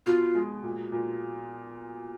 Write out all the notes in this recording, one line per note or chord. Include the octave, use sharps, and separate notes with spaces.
B2 F4
G#3
A#2
A#2